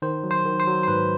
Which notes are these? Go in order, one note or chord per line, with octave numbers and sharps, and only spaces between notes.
D#3 C5
F#3
C5
D#3
C5
F#3
C5
G#2 B4